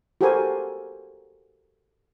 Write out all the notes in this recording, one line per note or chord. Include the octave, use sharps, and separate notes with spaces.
F#4 G4 A4 A#4 C5 G#5